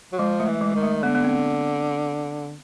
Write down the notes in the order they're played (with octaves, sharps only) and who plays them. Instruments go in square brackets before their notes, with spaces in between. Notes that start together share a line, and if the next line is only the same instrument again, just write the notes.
[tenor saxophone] F#3
[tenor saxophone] F3 [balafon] G#3
[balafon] A3
[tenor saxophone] E3
[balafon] G#3
[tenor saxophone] D#3 [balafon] G#3
[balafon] A3
[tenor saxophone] D3 [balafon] B3
[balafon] B3
C4